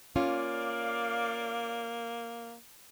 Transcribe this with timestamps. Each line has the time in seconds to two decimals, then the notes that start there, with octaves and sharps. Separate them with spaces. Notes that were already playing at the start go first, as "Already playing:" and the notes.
0.16 A#3 C#4 F4 D5 F5